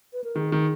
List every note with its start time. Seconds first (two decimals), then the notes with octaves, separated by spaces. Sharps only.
0.13 B4
0.24 A#4
0.36 D#3 G#4
0.52 D#3